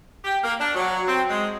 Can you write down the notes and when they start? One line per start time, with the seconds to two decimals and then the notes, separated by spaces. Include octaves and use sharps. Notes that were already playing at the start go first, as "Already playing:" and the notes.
0.25 G4
0.43 A#3
0.60 D4
0.75 F#3
1.08 C4
1.30 G#3